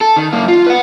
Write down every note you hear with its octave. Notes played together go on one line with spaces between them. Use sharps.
A4
D#3
F#2 A#3
F4
B4 F#5